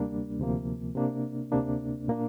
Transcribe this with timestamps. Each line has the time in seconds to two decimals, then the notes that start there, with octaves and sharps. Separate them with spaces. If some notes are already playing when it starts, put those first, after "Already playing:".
Already playing: D2 C3 G3 A#3 D4
0.39 D2 C3 F3 A#3
0.95 C3 A#3 D4
1.52 D2 C3 A#3 D4
2.08 A#2 A#3 D4